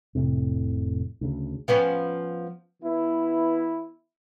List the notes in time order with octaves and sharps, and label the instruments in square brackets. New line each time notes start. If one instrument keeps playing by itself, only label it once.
[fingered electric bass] F1 A2 C3
D2 C#3
[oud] F3 B3 C#4
[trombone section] E3 B3 E4